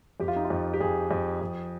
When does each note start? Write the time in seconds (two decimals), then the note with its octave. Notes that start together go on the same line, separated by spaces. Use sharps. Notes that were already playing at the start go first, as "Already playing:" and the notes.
0.20 F2 G4
0.28 F4
0.36 D#4
0.45 F4
0.50 F2
0.74 G4
0.81 F2 G#4
1.11 F2
1.41 F2